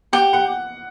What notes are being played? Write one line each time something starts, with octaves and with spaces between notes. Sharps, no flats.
G4 F#5
F#5